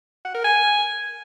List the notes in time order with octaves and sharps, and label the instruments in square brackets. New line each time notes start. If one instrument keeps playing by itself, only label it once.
[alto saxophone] F#5
A#4
G#5